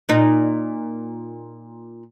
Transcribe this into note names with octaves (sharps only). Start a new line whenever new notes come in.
A#2 D#4